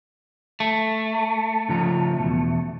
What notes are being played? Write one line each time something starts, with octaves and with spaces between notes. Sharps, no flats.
A3
C#3 F3 A#5
E2 B2